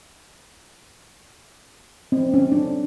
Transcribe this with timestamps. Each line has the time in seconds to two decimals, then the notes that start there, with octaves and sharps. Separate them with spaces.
2.12 C4
2.34 C#4
2.52 D4